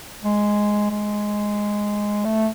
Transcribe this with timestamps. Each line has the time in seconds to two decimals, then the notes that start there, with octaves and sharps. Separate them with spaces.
0.24 G#3
0.90 G#3
2.25 A3